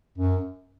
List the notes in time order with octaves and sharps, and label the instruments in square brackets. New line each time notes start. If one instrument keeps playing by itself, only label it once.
[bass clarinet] F#2